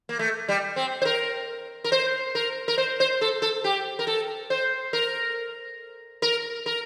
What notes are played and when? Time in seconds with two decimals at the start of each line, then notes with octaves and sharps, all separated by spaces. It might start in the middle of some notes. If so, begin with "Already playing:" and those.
0.09 A#3
0.19 A3
0.49 G3
0.76 C4
1.02 C5
1.05 A#4
1.84 A#4
1.92 C5
2.35 A#4
2.68 A#4
2.78 C5
3.00 C5
3.21 A4
3.42 A4
3.64 G4
3.99 A#4
4.07 A4
4.50 C5
4.93 A#4
6.22 A#4
6.66 A#4